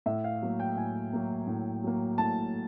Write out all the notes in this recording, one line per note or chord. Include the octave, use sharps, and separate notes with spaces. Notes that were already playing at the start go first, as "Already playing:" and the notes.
A2 E5
F5
F#3 A#3
G5
A2 G#5
F#3 A#3
A2
F#3 A#3
A2 A5